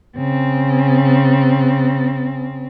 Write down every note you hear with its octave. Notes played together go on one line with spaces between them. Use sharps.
C#3 C4